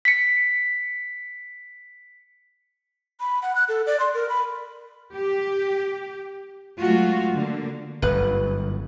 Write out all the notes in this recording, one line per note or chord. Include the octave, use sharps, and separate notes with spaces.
B6 C#7
B5
F#5
F#6
A4
D5
C6
A#4
B5
G4
F#3 G#3 A3 F4 F#4
D3 A#3
G1 F#2 B4